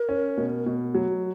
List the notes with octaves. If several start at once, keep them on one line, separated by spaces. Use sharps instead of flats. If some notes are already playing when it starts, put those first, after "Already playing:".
Already playing: A#4
C#4
B2
B2
F#3